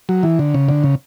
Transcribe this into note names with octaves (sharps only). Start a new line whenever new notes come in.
F#3
E3
D3
C#3
D3
C#3